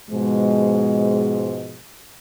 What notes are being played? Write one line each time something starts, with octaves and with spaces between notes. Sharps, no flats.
G#2 B2 F3 G#3